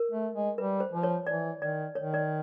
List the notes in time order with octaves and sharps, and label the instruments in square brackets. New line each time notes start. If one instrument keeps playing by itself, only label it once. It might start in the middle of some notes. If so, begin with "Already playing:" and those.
Already playing: [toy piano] A#4
[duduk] A3
G#3
[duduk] G3 [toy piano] B4
[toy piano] C5
[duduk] F3
[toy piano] C#5
[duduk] E3 [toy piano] D5
[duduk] D#3 [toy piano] D5
[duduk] D#3 [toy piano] C#5
[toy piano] D5